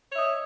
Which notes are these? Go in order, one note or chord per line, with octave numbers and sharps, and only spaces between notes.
C#5 D#5 E5